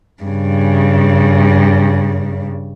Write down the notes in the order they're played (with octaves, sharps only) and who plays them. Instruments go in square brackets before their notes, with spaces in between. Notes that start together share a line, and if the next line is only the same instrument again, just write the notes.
[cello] G2 C#3